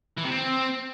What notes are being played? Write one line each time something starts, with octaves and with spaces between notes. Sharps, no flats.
E3
C3
C4